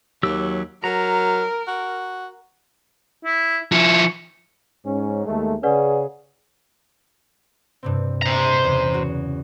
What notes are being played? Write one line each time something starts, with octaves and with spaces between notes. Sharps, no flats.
D#2 F#3 G4 E6
F#3 A#4 A#5
F#4
E4
F3 E4 C#6
G#2 C#4
D#2 G#3 A3
C#3 C#4 G#4 B4 D5 F#5
G2 C3 C4
C5 A#5
E2 C#3
F#4